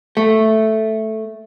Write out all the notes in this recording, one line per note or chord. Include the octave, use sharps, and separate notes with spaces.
A3